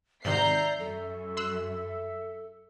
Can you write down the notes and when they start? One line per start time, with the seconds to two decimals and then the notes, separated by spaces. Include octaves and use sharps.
0.25 G#2 C3 D#3 D5 E5 A#5 G6 C7
0.79 F#2 A4
1.37 C6 E6 F#6